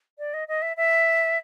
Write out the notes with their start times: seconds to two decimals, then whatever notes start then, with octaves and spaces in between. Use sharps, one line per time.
0.18 D5
0.33 D#5
0.48 D#5
0.62 E5
0.77 E5